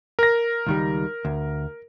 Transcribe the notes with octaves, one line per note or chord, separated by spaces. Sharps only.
A#4 A#6
C#2 D#3 G3
D2